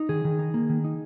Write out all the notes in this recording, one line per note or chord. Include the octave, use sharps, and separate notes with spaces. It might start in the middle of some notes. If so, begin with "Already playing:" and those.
Already playing: D#4
D#3 G#4
D#3
D#4
A#3
D#3
D#4